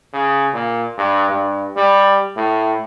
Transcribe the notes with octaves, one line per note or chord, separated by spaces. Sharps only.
C#3
A#2
G2
G2
G3
A2